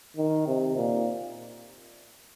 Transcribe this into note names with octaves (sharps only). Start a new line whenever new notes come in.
D#3
C3
A#2